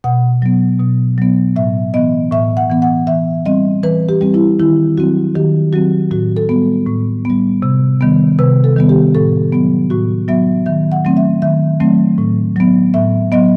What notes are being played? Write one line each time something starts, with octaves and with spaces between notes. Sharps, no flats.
B2 F#5
F#3 B3
B2
F#3 B3
A2 E5
E3 B3 D#5
A2 E5
F#5
E3 B3
F#5
E3 E5
G3 C4 D#5
E3 B4
G4
G3 C4
E4
D#3 E4
F#3 C4 F#4
D#3 G4
F#3 C4 F#4
A2 F#4
A4
G3 B3
A2
G3 B3
C3
D#3 G3 B3
C3 B4
A4
D#3 G3 B3
G4
A2 A4
F#3 B3
A2 F#4
F#3 B3 E5
D#3 E5
F#5
F#3 A3 C4
E5
D#3 E5
F#3 A3 C4
A2
F#3 B3
A2 E5
F#3 B3 D#5